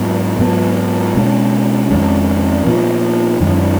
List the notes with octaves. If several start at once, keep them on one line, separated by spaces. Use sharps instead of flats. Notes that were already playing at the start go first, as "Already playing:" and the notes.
Already playing: G#2 F#3 B3
G#2 F#3 B3
B2 G#3 C#4
F2 D#3 G#3 C#4
A#2 F3 B3
F#2 D#3 G#3 C#4